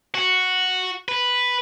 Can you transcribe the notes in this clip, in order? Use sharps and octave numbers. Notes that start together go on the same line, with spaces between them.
F#4
B4